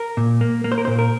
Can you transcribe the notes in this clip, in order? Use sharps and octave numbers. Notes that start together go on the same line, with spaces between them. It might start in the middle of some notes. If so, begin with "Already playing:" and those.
Already playing: A#4
A#2
A#3
A#3
C5
A#4
A#2 C5
A#4